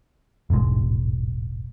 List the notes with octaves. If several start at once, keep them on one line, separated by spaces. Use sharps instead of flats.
E1 A1 G#2 G#3